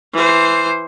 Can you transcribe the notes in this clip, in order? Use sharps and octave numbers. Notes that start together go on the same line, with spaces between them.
E3 C5